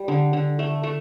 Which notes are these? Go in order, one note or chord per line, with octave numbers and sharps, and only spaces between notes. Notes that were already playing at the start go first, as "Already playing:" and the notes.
Already playing: G3
D3
D3
A3
A3